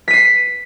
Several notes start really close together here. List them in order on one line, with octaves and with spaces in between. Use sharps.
B6 D#7 C7